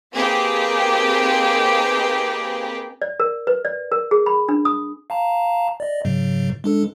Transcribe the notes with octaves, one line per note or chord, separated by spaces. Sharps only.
A#3 C4 D#4 G4 G#4 B4
D5
A#4
B4
D5
A#4
G#4
B5
D4
D#6
F5 A5 A#5
D5 D#5
G#2 C#3 F#3
G#3 D4 A4